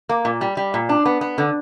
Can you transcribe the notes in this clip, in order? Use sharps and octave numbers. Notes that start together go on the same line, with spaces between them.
A#3
A#2
G3
G3
A#2
D4
B3
B3
D3